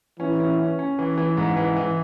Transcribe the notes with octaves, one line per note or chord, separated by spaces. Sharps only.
E3 C#4
C#4
C#4
C#4
E3
E3
G#2
E3
E3